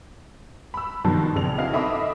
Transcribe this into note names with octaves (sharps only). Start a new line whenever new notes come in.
B5 E6
G2 B2 D#3 F3
A#1 C#3 C4 F7
C4 E4 F#4 D#5 F5
D#4 A4 D#5 E5 B5 D6